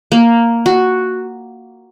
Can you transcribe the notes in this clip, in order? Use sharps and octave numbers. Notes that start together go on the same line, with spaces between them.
A#3
F#4